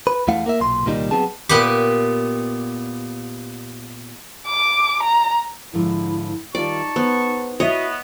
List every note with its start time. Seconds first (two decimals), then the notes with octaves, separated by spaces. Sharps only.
0.07 B4
0.28 E2 A3 E4 F5 F#5
0.46 A#3 A#4 E5
0.61 B1 A#2 C6
0.86 C2 A#2 D#3 G3 C#4 D#4
1.11 F#3 B3 C4 G#4 A5
1.49 A#2 B3 G4
4.47 D6
5.03 A#5
5.74 G#2 D3 F3 E4
6.55 D#3 G3 D#4 F4 D5 A5 C#6
6.96 B3 G#4 C5
7.60 B3 E4 F#4 C#5 D#5